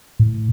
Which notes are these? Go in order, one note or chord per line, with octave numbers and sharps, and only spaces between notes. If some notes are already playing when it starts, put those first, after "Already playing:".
A2